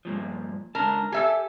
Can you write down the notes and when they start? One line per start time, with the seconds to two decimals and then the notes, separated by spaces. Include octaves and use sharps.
0.05 G2 A#2 F3
0.75 C#2 D4 A#4 A5
1.12 G4 A4 E5 G#5